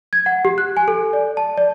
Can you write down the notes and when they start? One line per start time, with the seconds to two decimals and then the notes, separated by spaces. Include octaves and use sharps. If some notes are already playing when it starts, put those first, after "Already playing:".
0.13 G#6
0.26 F#5
0.45 G4
0.58 F#6
0.77 G#5
0.88 A4
1.13 D5
1.37 A5
1.58 D5